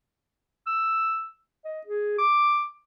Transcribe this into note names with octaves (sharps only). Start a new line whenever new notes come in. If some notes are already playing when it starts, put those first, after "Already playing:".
E6
D#5
G#4
D6